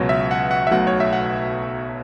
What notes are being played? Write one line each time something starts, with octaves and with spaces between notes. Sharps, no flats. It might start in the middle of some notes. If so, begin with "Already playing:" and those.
Already playing: C#2 B2 F#3 C#5
E5
F#5
F#5
E5
B1 B2 F#3 A3 F#5
C#5
E5
F#5